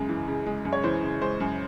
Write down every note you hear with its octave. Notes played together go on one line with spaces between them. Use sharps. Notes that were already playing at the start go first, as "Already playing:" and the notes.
Already playing: F#2 C#3 G#3
E3
C#3
G#3
F#2
C#5
E3 C5
C#3
G#3 C5
F#2